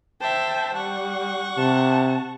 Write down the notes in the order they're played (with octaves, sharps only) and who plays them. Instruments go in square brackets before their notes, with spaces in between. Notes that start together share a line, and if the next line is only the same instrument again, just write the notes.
[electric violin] C5 E5 [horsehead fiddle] G5 A5
[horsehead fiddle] G3 [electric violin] F#5 C#6
[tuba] C3 [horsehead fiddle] A5